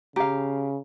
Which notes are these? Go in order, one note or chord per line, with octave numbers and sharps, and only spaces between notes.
C#3 G4 F5 A#5